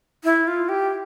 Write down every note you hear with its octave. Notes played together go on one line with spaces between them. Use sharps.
E4
F4
G4